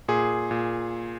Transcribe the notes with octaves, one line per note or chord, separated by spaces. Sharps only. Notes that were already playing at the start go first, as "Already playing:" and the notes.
A#2 G#4
A#2